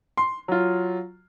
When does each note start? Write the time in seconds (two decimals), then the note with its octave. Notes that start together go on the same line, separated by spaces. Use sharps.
0.17 C6
0.48 F#3 F4